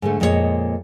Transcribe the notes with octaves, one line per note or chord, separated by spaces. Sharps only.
G#2 D3 A3
F2 A#2 G#3 E4 C#5 D#5